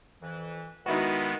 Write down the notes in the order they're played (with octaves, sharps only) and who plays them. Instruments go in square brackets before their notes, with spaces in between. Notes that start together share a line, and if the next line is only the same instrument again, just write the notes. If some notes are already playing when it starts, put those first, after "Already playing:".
[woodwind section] F2 E3
[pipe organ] D#3 G#3 B3 [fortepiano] D#4 E4 F#4 [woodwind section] B4